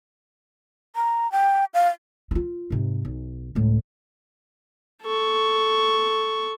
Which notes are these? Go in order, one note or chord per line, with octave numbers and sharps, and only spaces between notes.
A#5
G5
F5
D#4 F4
G#2 C3
B1
C#2 A2
A4 C#6